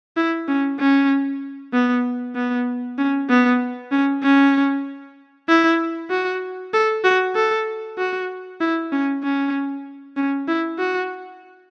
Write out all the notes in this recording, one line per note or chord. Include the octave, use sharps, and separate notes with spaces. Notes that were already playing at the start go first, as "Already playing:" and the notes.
E4
C#4
C#4
B3
B3
C#4
B3
C#4
C#4
E4
F#4
A4
F#4
A4
F#4
E4
C#4
C#4
C#4
E4
F#4